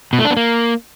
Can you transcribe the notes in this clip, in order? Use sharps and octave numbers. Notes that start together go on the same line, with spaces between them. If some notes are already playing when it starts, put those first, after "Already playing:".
B2
A3
D4
B3
A#3